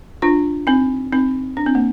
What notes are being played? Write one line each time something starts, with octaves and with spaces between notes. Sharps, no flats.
D4 F4
C4 D#4
C4 D#4
D4
C4
A#3